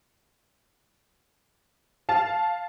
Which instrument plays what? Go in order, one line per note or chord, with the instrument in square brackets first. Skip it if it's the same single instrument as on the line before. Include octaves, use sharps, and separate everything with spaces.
[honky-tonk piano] F5 A5